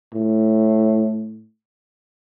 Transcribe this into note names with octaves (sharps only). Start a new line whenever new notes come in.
A2